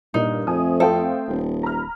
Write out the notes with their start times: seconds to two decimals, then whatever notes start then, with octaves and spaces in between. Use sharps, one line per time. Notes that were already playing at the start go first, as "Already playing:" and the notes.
0.14 G2 A#2 D#4
0.47 F2 A3 C4 G#5 D#6
0.80 A4 C5 F5 G5
1.28 D#1
1.63 A#5 B5 F6